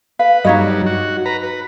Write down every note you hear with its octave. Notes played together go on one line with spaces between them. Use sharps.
B4 F5
G2 F#3 D#4 C#5 D#5
F#4
B4 A#5
B4